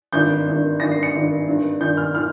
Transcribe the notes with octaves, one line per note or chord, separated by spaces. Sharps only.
G#1 G2 D#3 G6
G#1 G2 D#3
G#1 G2 D#3 A#6
C7
C#7
G#1 G2 D#3
G#1 G2 D#3
G#1 G2 D#3 G6
F6
D#3 F6